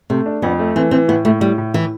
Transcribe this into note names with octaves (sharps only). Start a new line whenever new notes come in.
C3 A3
D4
F2 B3
A3
E3 C4
E3 C4
A2 B3
A2 A3
A2 G3
A2
A2 E3